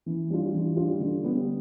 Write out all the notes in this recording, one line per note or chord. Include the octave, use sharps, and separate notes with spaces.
E3
G3 D4 F4
E3
G3 D4 F4
D3
G3 B3